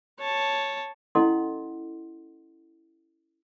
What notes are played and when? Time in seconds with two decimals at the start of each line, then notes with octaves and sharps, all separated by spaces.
0.19 C#5 A5
1.15 C#4 E4 A4 D#5 F#5 C6